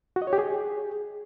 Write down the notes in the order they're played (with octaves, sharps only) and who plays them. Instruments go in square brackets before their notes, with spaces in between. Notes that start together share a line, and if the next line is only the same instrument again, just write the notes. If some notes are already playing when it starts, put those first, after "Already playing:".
[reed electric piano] F#4
D#5
C#5
G4
G#4